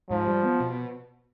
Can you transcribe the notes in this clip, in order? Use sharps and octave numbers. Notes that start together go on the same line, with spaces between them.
G#2 F3
G3
B3
B2